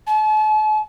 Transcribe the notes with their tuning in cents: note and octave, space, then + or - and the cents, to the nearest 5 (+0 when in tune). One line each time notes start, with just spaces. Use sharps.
A5 -45